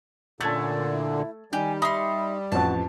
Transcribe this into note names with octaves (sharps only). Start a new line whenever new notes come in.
A#2 D3 A3 C#4 A5 G#6 A6
E4
D#3 G3 G4 G#5
D#4 E5 B5 C6
A1 F2 F#4 A5